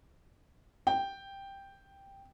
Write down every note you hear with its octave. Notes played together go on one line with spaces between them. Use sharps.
G5